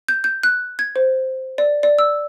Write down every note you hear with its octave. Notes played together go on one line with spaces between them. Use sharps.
G6
G6
F#6
G#6
C5
D5
D5
E6